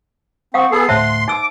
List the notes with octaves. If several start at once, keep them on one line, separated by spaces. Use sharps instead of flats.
C4 F5 F#5 C#6 D#6
B3 G#4 A4 C7
D2 A2 C5 E5 A5 C6
D#4 D6 E6